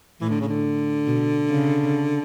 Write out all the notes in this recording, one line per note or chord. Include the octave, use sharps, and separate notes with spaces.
A2 E3
D3
C#3
D3
B2
C#3